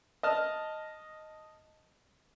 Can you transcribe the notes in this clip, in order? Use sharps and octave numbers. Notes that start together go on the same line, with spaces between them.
D#5 A5 F6